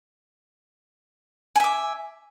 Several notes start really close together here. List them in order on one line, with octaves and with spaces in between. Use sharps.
G#5 E5 D6